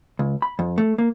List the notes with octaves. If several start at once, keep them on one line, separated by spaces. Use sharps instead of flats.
C#2
B5
F2
A3
A#3